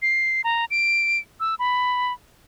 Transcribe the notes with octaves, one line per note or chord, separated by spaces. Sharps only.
C7
A#5
D7
E6
B5